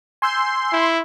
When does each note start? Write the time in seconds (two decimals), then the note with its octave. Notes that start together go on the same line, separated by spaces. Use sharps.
0.22 G#5 C6 E6 G6
0.72 E4